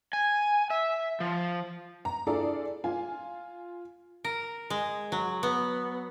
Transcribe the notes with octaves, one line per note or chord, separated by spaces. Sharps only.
G#5
E5
F3
A#5
D4 E4 F4 G#4 A4 D5
F4 G#5
A#4
G#3
F#3
B3